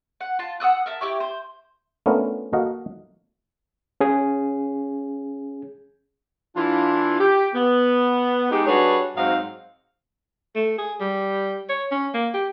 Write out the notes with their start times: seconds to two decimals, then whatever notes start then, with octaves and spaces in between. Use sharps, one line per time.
0.21 F#5
0.39 F4 A5
0.60 F#5 D#6 E6 F#6
0.86 A#4 E5 A5
1.01 E4 G4 C#5
1.20 C5
2.06 A3 B3 C#4 D4 F4 A#4
2.53 A#3 F#4 A4 D#5 F5 F#5
4.00 C#4 G#4
6.56 E3 D4 E4 F4
7.19 G4
7.55 B3
8.51 G#3 D#4 G4
8.66 G3 D4 F#4 G#4 B4 C#5
9.16 G#2 F#3 C4 D#5 F5
10.55 A3
10.78 G#4
11.00 G3
11.69 C#5
11.91 C#4
12.14 A#3
12.34 G4